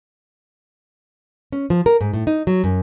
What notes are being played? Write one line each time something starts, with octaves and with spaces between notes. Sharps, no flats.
C#4
F3
A#4
G#2
A2
D#4
F#3
F#2